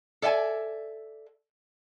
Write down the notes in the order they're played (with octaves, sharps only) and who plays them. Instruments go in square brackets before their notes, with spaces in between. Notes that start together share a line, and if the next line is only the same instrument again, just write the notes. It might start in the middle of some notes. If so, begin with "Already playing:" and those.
[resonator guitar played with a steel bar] A4 D5 E5 G5 G#5